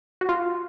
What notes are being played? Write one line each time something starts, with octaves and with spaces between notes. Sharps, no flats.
F#4
F4